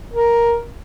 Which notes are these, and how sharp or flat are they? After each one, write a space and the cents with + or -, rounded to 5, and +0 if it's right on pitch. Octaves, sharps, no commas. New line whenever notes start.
A#4 +5